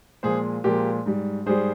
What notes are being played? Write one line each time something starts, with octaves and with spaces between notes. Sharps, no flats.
A#2 F3 G#3 G#4 C5
A#2 F3 G#3 G4 A#4
G#2 G3
G#2 G3 G#4 C5